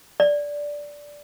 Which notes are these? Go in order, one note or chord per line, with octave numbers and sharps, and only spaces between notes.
D5